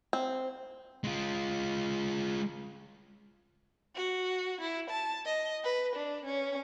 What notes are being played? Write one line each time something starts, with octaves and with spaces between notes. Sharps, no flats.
C4
G#3 F4
F#4
E4
A5
D#5
B4
D4
C#4